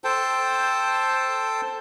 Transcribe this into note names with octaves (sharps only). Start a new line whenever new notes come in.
A4 C5 G5 A5